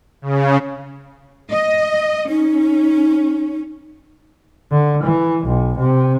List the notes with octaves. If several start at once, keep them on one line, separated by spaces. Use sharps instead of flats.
C#3
D#5
C#4 D#4
D3
E3
B1
C3